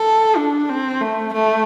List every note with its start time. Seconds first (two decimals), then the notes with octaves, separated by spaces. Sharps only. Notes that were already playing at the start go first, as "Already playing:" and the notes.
Already playing: A4
0.37 D4
0.69 C4
1.01 A3
1.33 A3